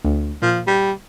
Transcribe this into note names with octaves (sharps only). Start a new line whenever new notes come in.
D2
A#2 F3
G3